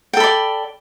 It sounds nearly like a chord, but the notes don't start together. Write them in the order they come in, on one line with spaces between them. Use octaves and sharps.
G5 A4 B5 D5